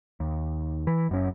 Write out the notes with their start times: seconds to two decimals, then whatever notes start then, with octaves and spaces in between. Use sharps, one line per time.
0.20 D#2
0.87 E3
1.09 F#1 F#2 C#4